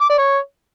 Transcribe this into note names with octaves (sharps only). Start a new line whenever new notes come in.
D6
D5
C#5